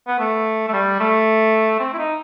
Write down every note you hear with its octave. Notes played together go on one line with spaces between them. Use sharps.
B3
A3
A3
G3
A3
C4
E4
D#4